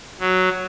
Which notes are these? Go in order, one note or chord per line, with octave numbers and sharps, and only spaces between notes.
F#3